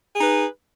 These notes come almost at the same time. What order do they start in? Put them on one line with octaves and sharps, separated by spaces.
G#4 D#4 B4